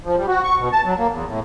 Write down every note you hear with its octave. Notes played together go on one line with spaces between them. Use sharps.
F3
G3
F#4
C#6
B2
A5
F#3
A#3
E2
A2